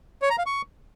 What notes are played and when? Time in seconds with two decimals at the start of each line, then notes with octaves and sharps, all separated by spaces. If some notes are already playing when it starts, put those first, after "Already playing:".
0.22 C#5
0.30 A#5
0.38 F5
0.46 C#6